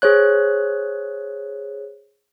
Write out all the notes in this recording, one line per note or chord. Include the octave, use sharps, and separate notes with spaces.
G#4 C5 C#5 F#6